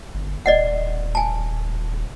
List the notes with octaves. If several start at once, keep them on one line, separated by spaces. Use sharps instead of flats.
G1
D#1 D5 D#5 F#5
G#5 A5